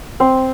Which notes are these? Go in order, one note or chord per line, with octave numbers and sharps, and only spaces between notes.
C4